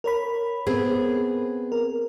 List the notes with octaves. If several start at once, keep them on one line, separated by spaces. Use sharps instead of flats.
A#4 C#5 B5
B3 C4 G#4
A#4